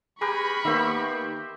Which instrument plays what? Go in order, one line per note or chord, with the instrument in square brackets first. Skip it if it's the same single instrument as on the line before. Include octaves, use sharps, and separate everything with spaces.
[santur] G4 A#4 B4 [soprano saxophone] G#4 [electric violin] B5 C#6
[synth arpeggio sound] D#3 A#3 [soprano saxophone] B3 [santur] G4 C5 E5